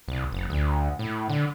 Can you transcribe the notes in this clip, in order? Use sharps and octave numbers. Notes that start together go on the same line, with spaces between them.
C2
F#1
D2
A2
D3